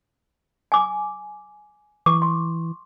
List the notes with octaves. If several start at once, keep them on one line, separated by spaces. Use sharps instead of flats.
G#5 D6
E3 C#6 D6
C6